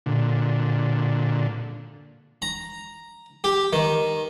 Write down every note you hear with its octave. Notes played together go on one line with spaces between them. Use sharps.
A#2 D3
A#5
G4
D#3